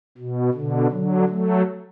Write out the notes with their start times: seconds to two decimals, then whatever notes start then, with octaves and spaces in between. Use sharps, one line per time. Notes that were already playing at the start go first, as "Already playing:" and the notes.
0.18 B2
0.54 B2 D3
0.91 D3 F#3
1.28 F#3 A3